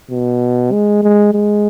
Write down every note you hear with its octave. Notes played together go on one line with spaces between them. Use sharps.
B2
G#3
G#3
G#3